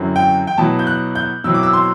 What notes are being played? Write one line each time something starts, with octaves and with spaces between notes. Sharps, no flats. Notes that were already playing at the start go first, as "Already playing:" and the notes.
Already playing: F#2 D3 F#3 C4 E4
G5
G5
B2 F#3 B3 E4 A5
G6
F#6
G6
B2 F#3 C4 E4 E6
D6
E6
C6